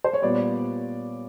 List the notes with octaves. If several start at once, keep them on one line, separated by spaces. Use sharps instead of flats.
C5
C#5
A#2 G3 B3 D5